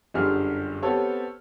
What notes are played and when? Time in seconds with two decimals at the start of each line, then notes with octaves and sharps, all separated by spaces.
0.14 G1 F#2 D3 G4 G#4 F6
0.82 B3 C4 G4 A4 C#5